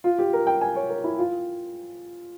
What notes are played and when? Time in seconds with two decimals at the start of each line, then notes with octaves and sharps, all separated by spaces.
0.04 F4
0.18 G4
0.33 A#4
0.47 G5
0.61 G#5
0.76 C#5
0.90 A#4
1.04 E4
1.18 F4